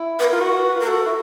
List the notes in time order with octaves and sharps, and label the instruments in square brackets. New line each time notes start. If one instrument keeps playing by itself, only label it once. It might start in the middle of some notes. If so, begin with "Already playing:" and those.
Already playing: [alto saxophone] E4
[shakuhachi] B4
A#4
[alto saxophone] F4
F#4
[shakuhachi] B4
[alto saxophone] F4 [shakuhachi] A#4
[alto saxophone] F#4 [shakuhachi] A4
[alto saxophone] E4